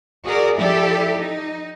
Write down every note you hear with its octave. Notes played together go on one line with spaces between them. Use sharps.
F#4 G#4 A#4 D5
F3 E4 G4 A4 D5
D#4